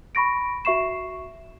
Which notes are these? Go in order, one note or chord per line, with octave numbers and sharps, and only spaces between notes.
B5 C#6 A#6 D7
F#4 E5 C#6 C7 E7